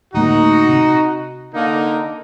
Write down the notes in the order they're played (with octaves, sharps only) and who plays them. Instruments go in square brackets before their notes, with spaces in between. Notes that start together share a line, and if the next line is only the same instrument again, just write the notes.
[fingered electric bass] D1 A3 A#3 [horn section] D#4 F#4
[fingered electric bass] C3
[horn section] D3 A#3 D#4